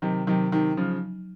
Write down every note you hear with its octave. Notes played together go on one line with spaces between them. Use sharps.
C3 D#3 F#3
C3 D#3 F#3
C3 D#3 D#4
C#3 F3 F#3